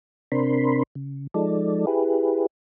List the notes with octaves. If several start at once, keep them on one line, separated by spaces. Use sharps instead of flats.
C3 C4 D4 A#4 B5 C6
C#3
F3 G#3 D#4 A4 D5
E4 G4 G#4 B4